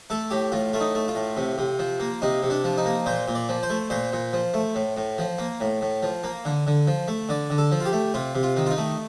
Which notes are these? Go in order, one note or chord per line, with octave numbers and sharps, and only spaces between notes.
A3 A4
A2 G4
A2 F4
A3 F4
D#4
A3
F4
A2
C3
C3
F3
A#3
C3 D#4
C3
D4
F3
D#4
A#3
A#2 C5
A#2
D5
F3
C5
A3
A#2 C5
A#2
F3
A3
A2
A2
F3
A#3
A2
A2
F3
A#3
D3
D3
F3
A3
D3 D5
D3
A4
F3
F4
G4
A3
C3 F4
C3
F4
D#3
F4
D#4
A3